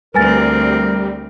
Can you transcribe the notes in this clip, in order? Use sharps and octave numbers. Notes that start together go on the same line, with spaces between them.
D2 G3 C4 A#4 B4 G#5 A6